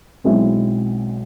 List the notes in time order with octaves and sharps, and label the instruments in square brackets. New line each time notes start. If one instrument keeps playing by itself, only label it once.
[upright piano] B1 B2 G#3 C4 E4